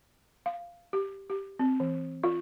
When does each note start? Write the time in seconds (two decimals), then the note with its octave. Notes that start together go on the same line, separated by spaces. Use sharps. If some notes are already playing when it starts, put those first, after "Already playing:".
0.46 F5
0.93 G4
1.30 G4
1.59 C4
1.80 E3
2.23 F4